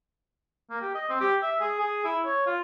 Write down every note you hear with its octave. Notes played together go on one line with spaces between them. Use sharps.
A#3
G4
D#5
C4
G4
E5
G#4
G#4
E4
C#5
F4